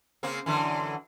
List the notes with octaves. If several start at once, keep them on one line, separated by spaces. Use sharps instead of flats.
C#3 A#3 C4
F#2 D3 E3